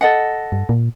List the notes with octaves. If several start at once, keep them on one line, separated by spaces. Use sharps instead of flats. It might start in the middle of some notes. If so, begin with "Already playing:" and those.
A4 D#5 F#5
G2
A#2